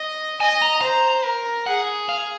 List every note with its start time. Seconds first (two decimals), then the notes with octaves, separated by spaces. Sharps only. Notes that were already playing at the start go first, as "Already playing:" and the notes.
Already playing: D#5
0.40 D#5 G#5
0.62 A#5
0.81 C5 A#5
1.25 A#4
1.66 G#4 F#5
2.09 F5